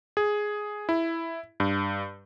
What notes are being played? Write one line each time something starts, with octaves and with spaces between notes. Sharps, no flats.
G#4
E4
G2